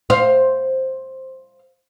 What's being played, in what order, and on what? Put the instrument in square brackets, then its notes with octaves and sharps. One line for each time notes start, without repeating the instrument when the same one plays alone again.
[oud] C5 F5